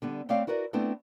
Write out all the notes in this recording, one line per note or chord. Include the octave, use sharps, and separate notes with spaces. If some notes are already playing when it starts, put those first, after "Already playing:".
D3 G3 B3
A3 C4 C#5 D5 E5 F5
E4 F#4 A#4 B4 D5
A3 B3 C4 D4 E4 A4